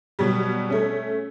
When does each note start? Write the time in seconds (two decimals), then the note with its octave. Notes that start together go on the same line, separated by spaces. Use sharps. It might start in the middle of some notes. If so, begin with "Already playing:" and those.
0.19 B2 F#3 G3
0.70 A3 C#4